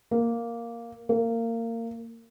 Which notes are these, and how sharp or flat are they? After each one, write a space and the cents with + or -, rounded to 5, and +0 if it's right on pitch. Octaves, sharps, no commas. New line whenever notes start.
A#3 +0
A#3 -25